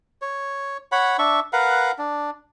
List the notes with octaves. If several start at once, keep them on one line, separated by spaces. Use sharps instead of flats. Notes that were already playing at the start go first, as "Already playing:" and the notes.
C#5
C#5 F#5 B5
D4 E5 C#6
A#4 B4 F5 F#5
D4